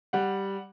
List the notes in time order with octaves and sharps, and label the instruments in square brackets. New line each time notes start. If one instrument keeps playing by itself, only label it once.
[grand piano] G3 F#5